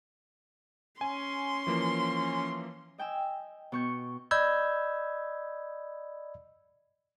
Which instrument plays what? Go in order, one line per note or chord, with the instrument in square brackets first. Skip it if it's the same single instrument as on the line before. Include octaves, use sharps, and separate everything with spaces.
[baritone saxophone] C#4 [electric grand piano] G#5 [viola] C6
[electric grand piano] E3 F3 A#3
[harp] D#5 G5 G#5 E6
B2 C#6 G6
[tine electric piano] D5 D#5 B5 E6 G6 G#6